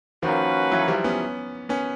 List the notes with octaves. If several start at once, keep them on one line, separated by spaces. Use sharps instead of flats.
D#3 F3 A#3 C#4 F#4 B4
E3 F#3
F3 G3
B3 C#4
B3 C#4